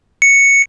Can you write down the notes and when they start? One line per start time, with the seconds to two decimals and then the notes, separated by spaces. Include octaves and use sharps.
0.22 C#7